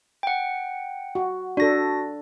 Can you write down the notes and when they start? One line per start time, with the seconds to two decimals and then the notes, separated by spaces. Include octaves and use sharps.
0.23 F#5 G5
1.15 F#4
1.57 D4 F#4 A4 A#6